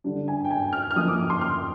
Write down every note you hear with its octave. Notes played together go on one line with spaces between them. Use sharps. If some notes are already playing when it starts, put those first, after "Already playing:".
D3 G3 D4
G#5
G5
G#5
F6
F6
F3 A#3 D#4 D#6
D6
D6
C6
F6